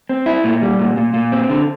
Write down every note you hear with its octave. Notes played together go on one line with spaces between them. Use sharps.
C4
E4
A#2
G3
A#2
A#2
A#2
C4
D3